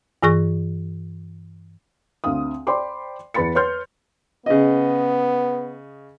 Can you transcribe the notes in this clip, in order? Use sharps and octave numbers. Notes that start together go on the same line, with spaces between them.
G2 E3 G#4 C#6 A#6
D2 C4 F5 D#6
C5 D5 G5 B5 C6 D6
E2 B4 B5 A6 C#7
B4 C#5 C6 F6 G6
C#3 B3 D#5